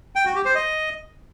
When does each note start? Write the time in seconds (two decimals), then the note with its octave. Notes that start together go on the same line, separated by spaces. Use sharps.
0.16 G5
0.25 F#4
0.35 G4
0.45 C5
0.55 D#5